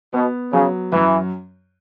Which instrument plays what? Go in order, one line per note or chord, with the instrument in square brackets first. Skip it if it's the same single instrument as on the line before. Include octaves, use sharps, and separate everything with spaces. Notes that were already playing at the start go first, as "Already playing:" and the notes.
[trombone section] B2 [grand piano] B3
[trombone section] C#3 [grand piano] F#3
[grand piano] F#2 [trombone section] E3